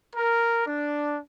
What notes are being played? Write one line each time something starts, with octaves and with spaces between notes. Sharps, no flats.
A#4
D4